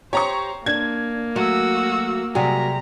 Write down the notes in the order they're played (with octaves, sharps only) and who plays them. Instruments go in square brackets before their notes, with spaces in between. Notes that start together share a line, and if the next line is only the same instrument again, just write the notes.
[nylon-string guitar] G4 [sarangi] C5 [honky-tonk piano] C#5 A#5 C#6
[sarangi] A#3 [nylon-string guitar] D4 [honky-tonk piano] G#6
[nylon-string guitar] F#3 A3 [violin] F#4 E6
[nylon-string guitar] C3 G3 G#4 [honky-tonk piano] F#3 [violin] A#5